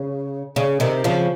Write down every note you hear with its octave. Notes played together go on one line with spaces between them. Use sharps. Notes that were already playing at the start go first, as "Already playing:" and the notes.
Already playing: C#3
C#3
C3 D#3
C#3 F3